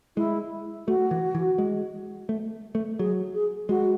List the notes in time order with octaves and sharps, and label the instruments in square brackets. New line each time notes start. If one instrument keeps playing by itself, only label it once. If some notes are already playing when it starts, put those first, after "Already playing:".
[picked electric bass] G#3 [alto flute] E4
[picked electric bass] A3 [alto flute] F#4
[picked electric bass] E3
E3
G#3
A3
A3
[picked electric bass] F#3 [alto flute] G#4
[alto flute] G#4
[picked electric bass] G#3 [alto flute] F#4